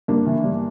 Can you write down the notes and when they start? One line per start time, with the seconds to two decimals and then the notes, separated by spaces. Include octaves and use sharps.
0.08 G2 A#3 D4
0.26 E3
0.44 G2